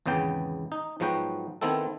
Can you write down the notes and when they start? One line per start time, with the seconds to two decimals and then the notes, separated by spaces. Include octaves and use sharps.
0.06 G#1 E2 C#3 B3 G5
0.72 D#4
1.00 G#2 F3 F#3 B3 F#4 G5
1.61 D#3 B3 C4 E4 A4